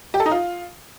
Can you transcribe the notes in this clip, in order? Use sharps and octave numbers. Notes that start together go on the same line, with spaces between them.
G4
A4
D#4
F4